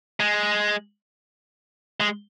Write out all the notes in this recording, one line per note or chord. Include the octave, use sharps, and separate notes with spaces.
G#3
G#3